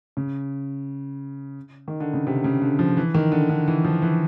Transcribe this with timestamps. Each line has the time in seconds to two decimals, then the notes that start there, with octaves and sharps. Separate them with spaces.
0.17 C#3
1.88 D#3
2.00 D3
2.14 C#3
2.27 C3
2.44 C#3
2.62 D3
2.79 F3
2.97 E3
3.14 D#3
3.32 D3
3.49 D3
3.68 E3
3.84 F3
4.02 E3